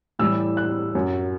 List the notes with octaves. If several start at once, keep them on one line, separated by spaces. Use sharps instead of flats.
A2 E3 G3 E6
F#6
F#2 F#3